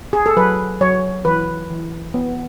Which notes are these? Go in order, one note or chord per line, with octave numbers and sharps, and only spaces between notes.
G#4
A4
F#3 B4
F#3 C#5
E3 B4
E3
B3